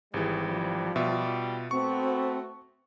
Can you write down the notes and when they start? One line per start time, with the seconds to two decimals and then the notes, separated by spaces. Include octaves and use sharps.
0.14 G#1 E3 G3 G#4
0.49 F3
0.96 B2 G3 F4 E5
1.71 A3 B3 C4 F#4 C#6